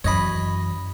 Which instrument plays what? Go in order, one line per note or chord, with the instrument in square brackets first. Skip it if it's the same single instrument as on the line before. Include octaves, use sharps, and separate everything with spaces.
[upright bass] F#2 E3 [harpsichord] C#5 D#5 B5